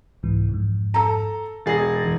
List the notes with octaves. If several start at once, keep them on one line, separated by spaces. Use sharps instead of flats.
C2 G#2 E3
F2 G#2
A4 A#5
E1 G#4 A6 A#6
F2 E3